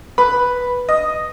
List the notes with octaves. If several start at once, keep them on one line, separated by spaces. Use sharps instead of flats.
B4 B5
D#5 D#6